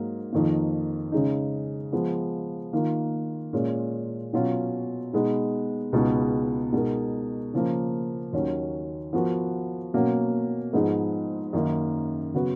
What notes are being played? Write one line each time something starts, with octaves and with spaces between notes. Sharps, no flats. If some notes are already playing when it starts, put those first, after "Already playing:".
Already playing: G#2 F#3 A#3
F2 D#3 A#3
C#3 G#3 D#4
F3 G#3 B3
D#3 A#3 F4
A#2 G#3 C#4 F4
B2 F#3 C#4 F4
B2 G#3 B3 D#4
C#2 B2 G#3 B3 D#4
B2 G#3 D#4 A#4
C#3 F3 A#3
D#2 D#3 F#3 C#4
F3 B3 F#4 A#4
B2 F#3 A#3 C#4 F#4
G#2 F3 B3 D#4 G#4
F#2 D#3 A#3 D#4
C#3 F#3 B3 F#4 B4